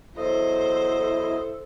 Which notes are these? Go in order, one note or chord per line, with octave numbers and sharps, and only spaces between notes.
E2 F#3 E4 A4 C5 D#5